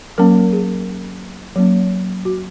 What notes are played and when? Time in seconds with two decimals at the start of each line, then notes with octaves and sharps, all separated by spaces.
0.18 F#3 A#3 C#4 A#4
0.52 G#4
1.56 F#3 A#3 C#4
2.25 F#4